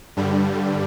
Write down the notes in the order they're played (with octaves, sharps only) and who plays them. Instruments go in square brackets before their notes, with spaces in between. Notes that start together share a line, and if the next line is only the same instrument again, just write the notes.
[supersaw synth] G2 D3 G3